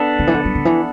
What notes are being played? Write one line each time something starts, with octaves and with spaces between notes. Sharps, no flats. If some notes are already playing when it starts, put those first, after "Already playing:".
Already playing: B3 D4 A4
D3
E3
D3
F#3
D3
E3